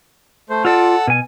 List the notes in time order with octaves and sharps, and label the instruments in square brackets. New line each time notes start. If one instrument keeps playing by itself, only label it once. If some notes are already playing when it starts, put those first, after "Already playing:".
[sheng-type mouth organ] A3 C5
[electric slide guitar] F4 D5 [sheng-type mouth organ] A4 F#5 E6
[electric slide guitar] B2 G#5